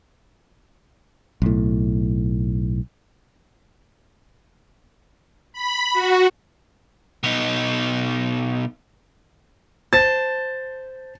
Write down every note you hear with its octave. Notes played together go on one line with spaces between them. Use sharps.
B1 A2
B5
F#4
B2 D#4
C5 A5 A6